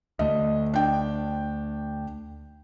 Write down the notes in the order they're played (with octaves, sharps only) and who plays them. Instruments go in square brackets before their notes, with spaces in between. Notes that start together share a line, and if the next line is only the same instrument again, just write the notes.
[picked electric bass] D2 D3 A3 [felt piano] D#5
[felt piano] D4 G5